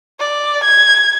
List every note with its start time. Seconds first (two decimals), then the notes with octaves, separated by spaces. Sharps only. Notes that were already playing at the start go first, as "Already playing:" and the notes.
0.20 D5
0.64 G#6